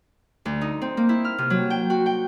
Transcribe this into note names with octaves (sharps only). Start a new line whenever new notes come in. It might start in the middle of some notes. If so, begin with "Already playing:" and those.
D2
D#4
C4
A#3
E4
F6
C3
F#3
G5
F#4
G5